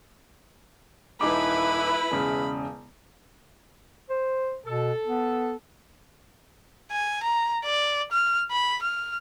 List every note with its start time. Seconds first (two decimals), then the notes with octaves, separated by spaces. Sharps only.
1.21 D#1 D#4 E4 B4 B5 D6
2.11 E1 C#3
4.10 C5
4.66 B2 A4
5.06 B3
6.91 G#5
7.23 A#5
7.64 D5
8.12 F6
8.51 B5
8.82 F6